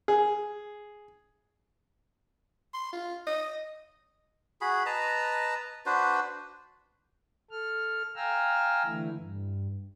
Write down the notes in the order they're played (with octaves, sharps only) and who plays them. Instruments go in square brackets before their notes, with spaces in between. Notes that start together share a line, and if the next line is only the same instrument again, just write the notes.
[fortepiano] G#4
[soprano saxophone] C6
F4
D#5
[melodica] F#4 G#4 B5
B4 D#5 A5 A#5
D4 F#4 B4 C5
[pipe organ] A4 F6
F5 G5 G#5 A#5 E6 F6
D3 E3 A3 E4
G2